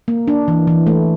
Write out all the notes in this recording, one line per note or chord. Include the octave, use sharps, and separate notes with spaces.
A#3
D4
E3
E3
A3